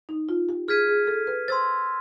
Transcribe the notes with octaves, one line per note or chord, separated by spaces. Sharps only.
D#4
F4
G4
G#4 F6 G#6 B6 D#7
G#4
A4
B4
C5 C6 E6 A6